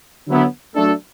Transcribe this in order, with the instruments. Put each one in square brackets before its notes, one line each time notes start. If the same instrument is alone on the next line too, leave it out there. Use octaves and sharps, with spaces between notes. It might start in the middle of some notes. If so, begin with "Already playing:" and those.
[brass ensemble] D3 F#3 B3 E4
F#3 A3 D4 A4